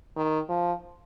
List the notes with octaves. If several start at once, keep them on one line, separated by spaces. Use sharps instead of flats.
D#3
F3